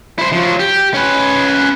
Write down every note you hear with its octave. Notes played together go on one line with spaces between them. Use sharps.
E4 C5
F3 F#3
G4
C#4 B4